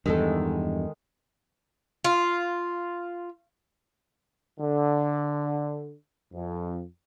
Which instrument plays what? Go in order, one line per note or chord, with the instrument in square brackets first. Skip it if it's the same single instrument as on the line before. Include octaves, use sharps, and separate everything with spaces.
[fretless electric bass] E2 G2 [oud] D#3 G#3 A4
[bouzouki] F4
[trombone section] D3
F2